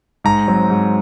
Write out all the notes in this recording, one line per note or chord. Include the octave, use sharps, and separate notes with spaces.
G#2 A#5
F#3 C4
G#2